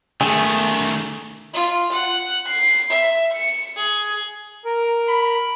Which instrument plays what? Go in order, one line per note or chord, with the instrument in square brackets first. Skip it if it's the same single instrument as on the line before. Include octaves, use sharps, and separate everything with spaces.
[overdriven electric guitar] D#3 A3 [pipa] G#4
[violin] F4
F#5
C7
E5
C#7
G#4
[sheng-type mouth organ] A#4
[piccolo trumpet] B5